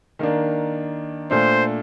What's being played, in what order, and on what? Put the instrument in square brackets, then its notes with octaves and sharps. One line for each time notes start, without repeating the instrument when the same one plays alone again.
[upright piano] D#3 A#3 D4
[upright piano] A#2 A3 D4 [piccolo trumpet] C5